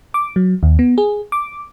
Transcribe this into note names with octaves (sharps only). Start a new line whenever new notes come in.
D6
F#3
D#2
B3
G#4
D6